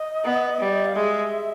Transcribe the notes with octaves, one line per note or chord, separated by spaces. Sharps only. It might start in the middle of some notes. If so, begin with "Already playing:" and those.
Already playing: D#5
B3
G3
F5
G#3 E5